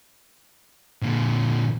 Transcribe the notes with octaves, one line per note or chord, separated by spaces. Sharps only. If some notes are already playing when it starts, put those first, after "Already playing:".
A#2 D3